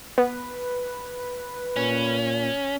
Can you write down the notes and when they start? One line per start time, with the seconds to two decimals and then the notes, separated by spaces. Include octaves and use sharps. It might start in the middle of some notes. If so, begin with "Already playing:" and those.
0.18 B3 B4
1.76 A#2 C#4